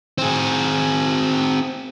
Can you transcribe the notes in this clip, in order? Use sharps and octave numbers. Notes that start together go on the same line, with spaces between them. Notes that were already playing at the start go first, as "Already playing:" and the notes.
C4 G#4